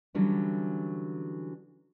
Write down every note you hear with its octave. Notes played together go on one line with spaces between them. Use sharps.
D3 E3 F#3 G3 C#4 D4